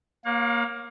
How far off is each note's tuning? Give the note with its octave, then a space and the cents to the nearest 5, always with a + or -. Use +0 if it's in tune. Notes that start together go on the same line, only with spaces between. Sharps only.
A#3 +10 C#5 -20 F5 +45